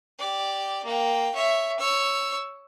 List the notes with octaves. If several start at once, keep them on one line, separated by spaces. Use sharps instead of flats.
G4 D5
A#3 G5
C#5 E5
C#5 E6